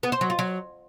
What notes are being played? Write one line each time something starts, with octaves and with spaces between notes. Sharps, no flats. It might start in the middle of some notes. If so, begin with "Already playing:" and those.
B3
C5
F#3
F4
F#3